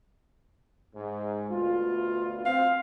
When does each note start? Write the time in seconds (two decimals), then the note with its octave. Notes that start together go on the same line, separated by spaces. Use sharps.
0.95 G#2
1.51 D2 B2 F4
2.46 C4 F5